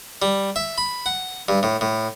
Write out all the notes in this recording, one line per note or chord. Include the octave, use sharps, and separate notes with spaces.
G3
E5
B5
F#5
G2
A2
A2